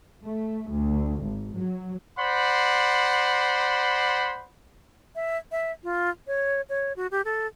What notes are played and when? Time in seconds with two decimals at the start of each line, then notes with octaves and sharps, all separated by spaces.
0.24 A3
0.70 D2
1.23 G#1
1.56 F#3
2.18 C5 D5 F#5 B5 C6
5.16 E5
5.52 E5
5.84 F4
6.27 C#5
6.69 C#5
6.96 F#4
7.11 G4
7.25 A4